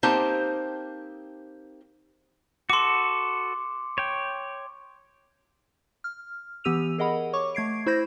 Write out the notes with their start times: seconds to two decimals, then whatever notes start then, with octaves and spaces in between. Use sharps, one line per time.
0.03 A#3 C4 D#4 G4 C5 A5
2.70 F#4 A4 C6 D6
3.98 C#5 G5
6.04 F6
6.64 E3 B3 G4 E6 D#7 F7
6.98 G#4 A#4 D#5 F#5 B5
7.33 C#5 C#6 D6
7.55 A3 G#6 C7 D7
7.86 E4 C5 B5 G6 A#6